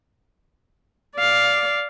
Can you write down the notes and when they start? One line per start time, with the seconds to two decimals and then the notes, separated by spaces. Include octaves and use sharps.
1.17 D5 F5